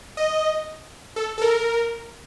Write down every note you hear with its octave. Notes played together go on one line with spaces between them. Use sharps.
D#5
A4
A4
A#4